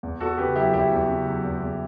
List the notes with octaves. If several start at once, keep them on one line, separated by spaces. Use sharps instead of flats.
E2
E2 F#4 A4
C#3 G4 B4
F#3 E4 G4
E2 E4 G4
E2
C#3
F#3
E2
E2